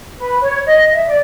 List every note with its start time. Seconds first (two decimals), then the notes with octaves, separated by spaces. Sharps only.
0.18 B4
0.42 C#5
0.66 D#5
0.90 E5
1.07 D5